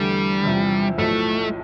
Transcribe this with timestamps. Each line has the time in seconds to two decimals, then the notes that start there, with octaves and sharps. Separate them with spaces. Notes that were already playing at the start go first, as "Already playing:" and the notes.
Already playing: E2 D3 G3 A3
0.44 E2 C3 F3
0.98 B1 A2 F3 A3